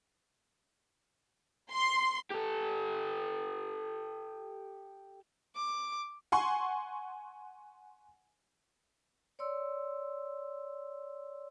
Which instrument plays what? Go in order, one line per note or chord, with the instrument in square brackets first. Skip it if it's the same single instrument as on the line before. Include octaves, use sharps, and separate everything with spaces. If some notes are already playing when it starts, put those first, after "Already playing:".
[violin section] C6
[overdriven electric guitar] G4 A4
[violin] D6
[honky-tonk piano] F#5 G#5 C6 C#6
[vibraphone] C#5 D5 C6 E6